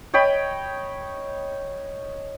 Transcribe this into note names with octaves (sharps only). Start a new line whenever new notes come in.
C#5 D#5 G5 B5